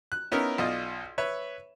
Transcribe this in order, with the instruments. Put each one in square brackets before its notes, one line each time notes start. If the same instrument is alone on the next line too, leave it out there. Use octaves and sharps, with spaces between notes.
[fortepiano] F#6
B3 C#4 D#4 E4 A#4
B1 F4 D5 D#5
B4 C#5 E5